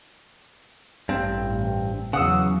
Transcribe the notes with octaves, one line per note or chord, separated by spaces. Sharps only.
A1 G2 C4
E2 C#3 F#3 F#5 D#6 E6